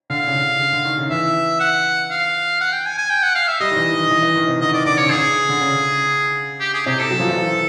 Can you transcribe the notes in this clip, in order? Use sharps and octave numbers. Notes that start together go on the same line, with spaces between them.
D3 F5
C#3
D3
C#3
D3
D#3
C#3
E3 E5
F#5
F5
F#5
G5
G#5
G#5
G5
F#5
F5
E5
G3 D#5
D#3
E3
E3
E3
E3
D#3
C3
D3 D#5
D#3 D5
D3 D5
C#3 C#5
D3
C#3 G#4
D3
C#3
G4
G#4
C3 G4
A4
F#3
F3
E3
F3